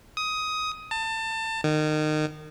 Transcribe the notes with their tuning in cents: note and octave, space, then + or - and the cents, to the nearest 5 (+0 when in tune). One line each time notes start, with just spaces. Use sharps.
D#6 +15
A5 +25
D#3 -25